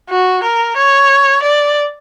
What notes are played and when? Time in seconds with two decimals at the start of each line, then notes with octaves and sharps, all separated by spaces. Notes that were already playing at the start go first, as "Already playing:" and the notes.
0.10 F#4
0.43 A#4
0.77 C#5
1.43 D5